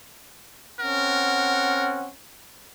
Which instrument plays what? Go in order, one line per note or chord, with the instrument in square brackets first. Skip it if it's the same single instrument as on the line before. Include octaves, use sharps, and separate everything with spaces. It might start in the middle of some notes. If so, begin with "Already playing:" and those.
[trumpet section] C4 C#4 F#5 [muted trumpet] A#4